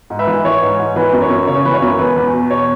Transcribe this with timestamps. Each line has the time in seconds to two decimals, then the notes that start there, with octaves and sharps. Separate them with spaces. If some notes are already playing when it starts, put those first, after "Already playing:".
0.10 G#2
0.19 B4 E5
0.27 E3
0.44 E3 C#5
0.62 G#2
0.79 G#2
0.96 E3 B4
1.13 F#2
1.22 C#5
1.30 F#2
1.47 C#3 C#5
1.65 E3 B4
1.74 C#5
1.82 F#2
1.99 E2 B4
2.16 E2
2.33 B2
2.50 B2 C#5